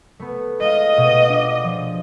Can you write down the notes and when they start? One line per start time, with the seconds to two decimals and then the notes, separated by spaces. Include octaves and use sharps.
0.20 A3 B3
0.61 G#3 F4 D#5 F5
0.97 B2
1.29 D4
1.64 F3